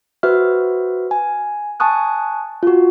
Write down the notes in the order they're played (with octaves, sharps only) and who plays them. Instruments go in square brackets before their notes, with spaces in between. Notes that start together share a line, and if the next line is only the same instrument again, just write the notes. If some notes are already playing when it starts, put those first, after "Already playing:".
[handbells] F#4 B4 C5 E5 F6
G#5
G#5 A5 C#6 D#6 F#6
F4 F#4